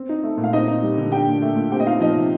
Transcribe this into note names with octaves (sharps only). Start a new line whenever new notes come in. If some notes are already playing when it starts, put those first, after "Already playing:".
Already playing: C4
D#4
A3
A#2
F5
C4 D#4 D#5
D#4
G3
D3
D4 G4 G5
A#2
A3
A#2
C4 G4 G5
D#5
D#4 F4 F5
F3 D#4 D#5
C3